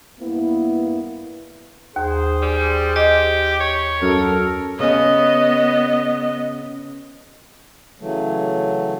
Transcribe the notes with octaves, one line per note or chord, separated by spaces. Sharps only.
G2 A#3 B3 E4
D#2 G#4 C5
G3
G4 D#5
C#5
F#2 A4 A#4
C#3 B3 C#4 D#5
C#3 E3 F#3 A3